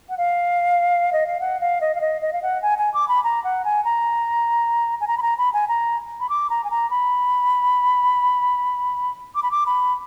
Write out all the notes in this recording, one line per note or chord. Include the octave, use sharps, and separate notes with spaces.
F#5
F5
D#5
F5
F#5
F5
D#5
F5
D#5
D#5
F5
F#5
G#5
G#5
D6
B5
A#5
F#5
G#5
A#5
G#5
A#5
B5
A#5
B5
G#5
A#5
B5
D6
A#5
G#5
A#5
B5
D6
B5
D6
B5